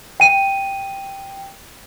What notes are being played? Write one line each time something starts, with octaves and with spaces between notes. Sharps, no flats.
G5 D#7